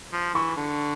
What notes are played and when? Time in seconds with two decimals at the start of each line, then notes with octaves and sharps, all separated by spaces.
0.13 F3
0.34 E3 C#6
0.57 D3